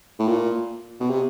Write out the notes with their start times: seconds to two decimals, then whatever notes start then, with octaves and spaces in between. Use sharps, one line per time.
0.19 A2
0.27 A#2
1.00 B2
1.10 C3